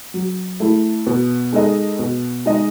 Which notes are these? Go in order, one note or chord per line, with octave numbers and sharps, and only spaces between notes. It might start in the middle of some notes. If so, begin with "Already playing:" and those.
F#3
A3 E4
B2
G#3 D#4 A4 D#5
B2
G#3 D#4 G#4 D#5